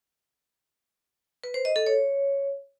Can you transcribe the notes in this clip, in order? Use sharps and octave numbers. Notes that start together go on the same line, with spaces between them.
B4
C5
D#5
A4
C#5